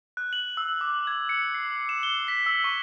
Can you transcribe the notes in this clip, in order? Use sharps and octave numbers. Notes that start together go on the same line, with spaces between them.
F#6
F#7
E6
D6
G#6
C#7
C7
E7
G7
B6
E6
C#6